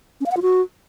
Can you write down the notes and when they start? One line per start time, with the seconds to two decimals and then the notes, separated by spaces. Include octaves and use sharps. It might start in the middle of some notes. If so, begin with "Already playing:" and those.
0.21 C#4
0.26 F5
0.31 F#5
0.37 F4
0.42 F#4